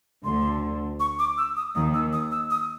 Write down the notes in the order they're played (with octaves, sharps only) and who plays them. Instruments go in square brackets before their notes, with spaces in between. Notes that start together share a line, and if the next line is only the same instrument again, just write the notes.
[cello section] D2 D3 [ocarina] C6
[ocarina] C#6
D6
E6
D#6
[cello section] D#2 D#3 [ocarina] D#6
[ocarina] E6
D#6
E6
D#6